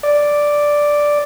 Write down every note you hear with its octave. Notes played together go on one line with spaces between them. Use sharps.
D5